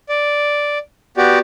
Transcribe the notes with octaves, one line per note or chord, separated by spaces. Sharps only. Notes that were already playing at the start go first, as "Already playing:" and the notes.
D5
B3 F#4 G4 D5